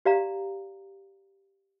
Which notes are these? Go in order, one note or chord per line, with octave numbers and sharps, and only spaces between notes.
G4 D5 F5 A#5